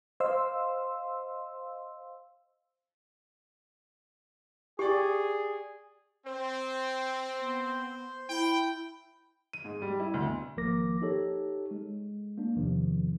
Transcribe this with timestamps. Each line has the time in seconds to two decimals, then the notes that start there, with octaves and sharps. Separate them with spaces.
0.20 C5 D#5 F5 C6 E6
4.79 G4 G#4 D5 G5 C#6
6.27 C4 C5
7.40 B3
8.29 E4 G5
9.53 D#7
9.64 G#2
9.82 G3
10.00 E4
10.14 D2
10.25 B2
10.57 G#1 F3 A#3 A#4 D6 A#6
11.02 D#4 G4 A4 C#5
11.71 G#3
12.37 A#3 D4
12.56 E2 C3 D#3 F3